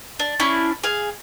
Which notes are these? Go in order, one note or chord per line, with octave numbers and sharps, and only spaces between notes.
D4
C#4 D4 E4 C#6
G#4 F5